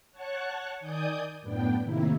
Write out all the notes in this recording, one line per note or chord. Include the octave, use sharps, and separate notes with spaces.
C#5 F#5 A5 C#6 F#6
D#3 D5 G#5 D#6 G6
F#2 A2 B3 D4 G5
A2 C3 D#3 A#3 E4